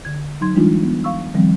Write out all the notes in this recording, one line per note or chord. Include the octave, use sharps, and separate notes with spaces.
D3 G#6
F#3 D#4 C6 G#6
E3 G3 G#3 D4 D#4 F4
B3
F5 C#6 E6
D#3 F3 G3 C4